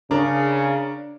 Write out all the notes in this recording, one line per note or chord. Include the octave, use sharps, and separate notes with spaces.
C#3 D4 A#4 D5